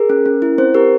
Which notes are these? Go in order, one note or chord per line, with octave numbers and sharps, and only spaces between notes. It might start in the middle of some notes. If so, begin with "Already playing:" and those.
Already playing: G#4 A#4
C#4
C#4
E4
C4 C5
G4 A#4